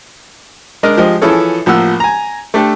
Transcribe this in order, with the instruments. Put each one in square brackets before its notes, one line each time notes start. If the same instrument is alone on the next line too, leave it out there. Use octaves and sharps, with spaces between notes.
[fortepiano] G#3 D4 A#4 D#5
F3 G#3 G4 C5 D#5
E3 F3 E4 G#4 A4 C#5
A1 F3 A#3 F#5 E6
G#5 A#5
A3 D4 G4 A4